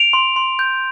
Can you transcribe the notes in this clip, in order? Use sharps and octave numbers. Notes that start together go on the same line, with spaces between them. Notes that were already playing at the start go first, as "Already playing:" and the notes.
Already playing: D7 F7
C6
C6
G6